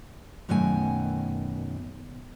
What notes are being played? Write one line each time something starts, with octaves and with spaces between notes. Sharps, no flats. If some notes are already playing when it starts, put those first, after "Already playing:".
F#2 B2 D#3 A3 G5 G#5